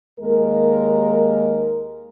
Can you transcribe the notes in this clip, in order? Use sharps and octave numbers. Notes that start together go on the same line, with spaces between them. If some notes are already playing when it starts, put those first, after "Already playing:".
D#2 G#3 A#3 A#4